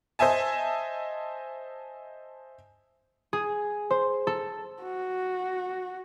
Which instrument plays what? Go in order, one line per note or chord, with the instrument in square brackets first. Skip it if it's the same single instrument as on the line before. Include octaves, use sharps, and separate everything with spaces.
[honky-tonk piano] C5 D#5 E5 G#5 A5
[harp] G#4
C5
A4
[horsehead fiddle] F#4